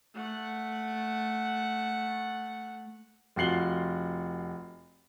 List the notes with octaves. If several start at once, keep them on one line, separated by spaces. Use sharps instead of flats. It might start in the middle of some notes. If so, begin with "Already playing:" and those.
A3 F#5
F1 F4 F#4 C7 F#7 G7